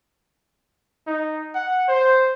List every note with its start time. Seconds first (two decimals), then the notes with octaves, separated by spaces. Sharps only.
1.07 D#4
1.54 F#5
1.88 C5